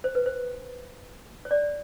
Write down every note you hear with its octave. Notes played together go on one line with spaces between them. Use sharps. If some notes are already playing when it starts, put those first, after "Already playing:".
C5
B4
C5
C#5
D5